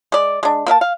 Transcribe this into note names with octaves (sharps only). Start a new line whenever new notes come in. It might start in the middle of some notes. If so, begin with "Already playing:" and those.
G#3 D5
G#3 D4
A#3 A#4 E5 A5
F5